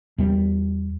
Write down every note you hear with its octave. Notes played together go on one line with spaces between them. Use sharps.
E2 G3